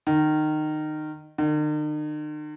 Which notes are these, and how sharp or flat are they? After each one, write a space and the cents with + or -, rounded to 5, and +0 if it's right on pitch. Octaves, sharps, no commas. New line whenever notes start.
D#3 -20
D#3 -45